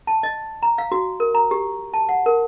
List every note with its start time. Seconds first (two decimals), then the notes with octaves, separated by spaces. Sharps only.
0.07 A5
0.23 D#5
0.63 A#5
0.78 F5
0.92 F#4
1.20 A#4
1.35 A#5
1.51 G4
1.94 A5
2.09 F#5
2.26 A#4